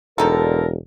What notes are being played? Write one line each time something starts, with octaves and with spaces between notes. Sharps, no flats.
E1 D3 D#3 D#4 A4 A#4